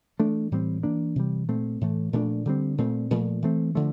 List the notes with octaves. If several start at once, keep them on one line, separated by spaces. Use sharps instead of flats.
E3 A3 D4
A2 E3 G3 C4
E3 A#3 D4
C3 E3 G3
A#2 A3 C4
A2 E3 A3
A#2 F3 A3 D4
D3 G3 C4
A#2 A3 C4
A#2 F3 A3
E3 A3 C4
D3 F3 A3